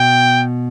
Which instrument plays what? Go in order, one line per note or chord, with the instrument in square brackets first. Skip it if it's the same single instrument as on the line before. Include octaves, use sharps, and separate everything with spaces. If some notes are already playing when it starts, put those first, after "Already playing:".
Already playing: [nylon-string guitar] B2 [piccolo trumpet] G5